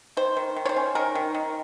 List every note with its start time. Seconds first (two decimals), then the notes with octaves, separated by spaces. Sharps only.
0.17 D#3 C5
0.37 D#3
0.56 D#3
0.65 C#5
0.69 C5
0.76 C#4
0.95 D#3 A#4
1.15 D#3
1.35 D#3